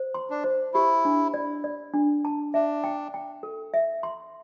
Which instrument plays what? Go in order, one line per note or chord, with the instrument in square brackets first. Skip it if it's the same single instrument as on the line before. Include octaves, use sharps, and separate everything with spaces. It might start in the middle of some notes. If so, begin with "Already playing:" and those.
Already playing: [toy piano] C5
C6
[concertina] D4
[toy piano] C5
[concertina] E4 [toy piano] G4
[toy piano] D4
D5
D5
D4
A5
[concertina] D4 [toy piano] E5
[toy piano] G5
G5
A4
E5
C6